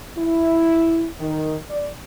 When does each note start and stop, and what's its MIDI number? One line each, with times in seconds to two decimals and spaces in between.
0.18 1.07 64
1.20 1.56 51
1.69 1.91 74